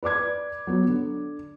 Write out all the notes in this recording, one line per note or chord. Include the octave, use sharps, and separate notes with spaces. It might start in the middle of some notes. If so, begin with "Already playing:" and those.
B4 D5 D6 G#6
F#3 B3
D3